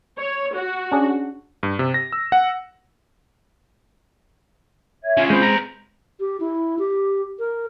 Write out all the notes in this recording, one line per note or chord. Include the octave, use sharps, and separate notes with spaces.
C#5
F#4
C#4 D4 G#4
G2
C3
A#6
E6
F#5
C#5 E5 G#6
C#4 F4
G#3 C4 B5 G6
B4 A#5
G4
E4
G4
A#4